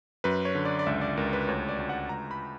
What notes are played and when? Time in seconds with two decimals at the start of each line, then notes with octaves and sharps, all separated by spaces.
0.24 F#2 B4
0.45 C#5
0.55 D3
0.65 D5
0.79 D5
0.86 C#2 E5
1.01 D5
1.17 C#2 A#4
1.33 B4
1.48 D2 C#5
1.69 D5
1.78 D2
1.89 F#5
2.09 C#2 A#5
2.31 B5